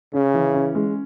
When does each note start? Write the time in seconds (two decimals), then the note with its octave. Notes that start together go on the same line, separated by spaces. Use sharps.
0.13 C#3 C#4
0.34 E3
0.55 C#4
0.75 G#3